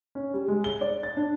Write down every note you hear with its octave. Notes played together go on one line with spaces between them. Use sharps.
C#4
G3
G#3
G7
D5
A6
D4